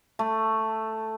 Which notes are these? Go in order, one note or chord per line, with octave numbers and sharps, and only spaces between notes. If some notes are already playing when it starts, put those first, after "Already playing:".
A3